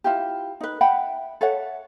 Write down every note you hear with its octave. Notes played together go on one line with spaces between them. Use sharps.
E4 F4 G4
D#4 B4
E5 F#5 G5 B5
A4 C#5 E5 F#5